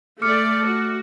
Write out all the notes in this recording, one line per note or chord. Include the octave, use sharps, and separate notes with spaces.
A3 D5 D6 F6 C#7
F#4